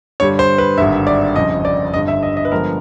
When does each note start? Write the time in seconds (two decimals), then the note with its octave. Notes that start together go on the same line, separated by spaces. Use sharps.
0.20 G2 D3 G3 C#5
0.39 C5
0.58 B4
0.78 G#1 G2 D3 E5
1.07 D5
1.36 G1 F2 C#3 D#5
1.65 D5
1.94 G1 G2 D3 D#5
2.08 E5
2.23 D#5
2.37 D#5
2.45 B4
2.51 G2 D3 F3 G#3 B3 A#4